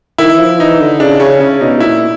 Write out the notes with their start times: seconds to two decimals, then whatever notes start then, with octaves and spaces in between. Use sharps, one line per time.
0.18 D#3 E4
0.32 E3
0.39 F3
0.59 E3 D#4
0.80 D3
1.00 C#3 D4
1.20 C#3 C#4
1.40 C#3 C#4
1.61 B2 D#4
1.77 B2
1.80 A#2 E4